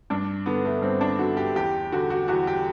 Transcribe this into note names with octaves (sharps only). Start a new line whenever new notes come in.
G2 D4
D3 B3
A3
G2 C4
D4
D3 F#4
G4
E2 G4
D3 F#4
F#4
E2 F#4
G4